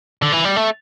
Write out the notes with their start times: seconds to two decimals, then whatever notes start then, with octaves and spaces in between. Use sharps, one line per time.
0.23 D3
0.32 E3
0.44 G3
0.56 A3